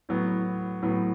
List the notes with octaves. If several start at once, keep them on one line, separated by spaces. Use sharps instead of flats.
A2 F#3 B3
A2 F#3 B3